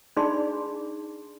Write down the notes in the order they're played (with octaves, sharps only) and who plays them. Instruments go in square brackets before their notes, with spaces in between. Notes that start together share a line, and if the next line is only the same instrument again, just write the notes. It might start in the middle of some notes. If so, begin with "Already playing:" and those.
[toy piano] D4 D#4 G#4 D5 B5 C6